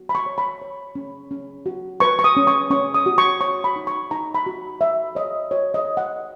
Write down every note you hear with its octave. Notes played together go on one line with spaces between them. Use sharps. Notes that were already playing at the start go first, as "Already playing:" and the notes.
Already playing: F#4
B5
C#6
C#5
B5
C#5
C#4
C#4
F#4
B4 C#6
C#6
D#6
C#4
C#6
C#4 C#6
D#6
F#4
C#6
C#5 C#6
B5
D#4
C#6
D#4 A#5
B5
F#4
F#4 E5
C#5 D#5
F#4 C#5
D#5
C#5
F#5